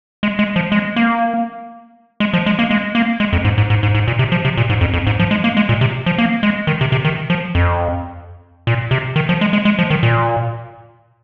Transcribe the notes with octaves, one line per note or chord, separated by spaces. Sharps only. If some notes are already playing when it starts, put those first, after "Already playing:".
G#3
G#3
F3
G#3
A#3
G#3
F3
G#3
A#3
G#3
A#3
G#3
F2
G#2
G#2
G#2
G#2
G#2
A#2
C3
F3
C3
A#2
G#2
F2
F2
G#2
F3
G#3
A#3
G#3
A#2
C3
F3
A#3
G#3
D#3
C3
C3
D#3
F3
F2
A#2
C3
D#3
F3
G#3
G#3
G#3
F3
D#3
A#2